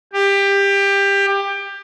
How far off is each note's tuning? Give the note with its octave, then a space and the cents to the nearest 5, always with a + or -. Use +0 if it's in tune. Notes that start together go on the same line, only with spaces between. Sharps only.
G4 +20